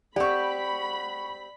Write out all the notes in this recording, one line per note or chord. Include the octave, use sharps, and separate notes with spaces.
C4 G4 D5 F#5 B5 C#6